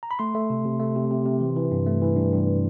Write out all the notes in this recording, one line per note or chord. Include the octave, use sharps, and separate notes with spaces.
A#5
B5
A3 C6
A3
C3
C3
A3
C3
C3
C3
E3
E3
G2
A3
E3
G2
G2